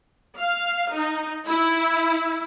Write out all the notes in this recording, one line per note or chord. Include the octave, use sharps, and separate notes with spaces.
F5
D#4
E4